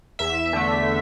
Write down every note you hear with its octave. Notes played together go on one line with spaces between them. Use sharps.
E2 E5
D3 A3